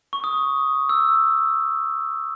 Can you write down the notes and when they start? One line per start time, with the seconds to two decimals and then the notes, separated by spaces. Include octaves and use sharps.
0.13 C#6
0.24 D#6
0.89 E6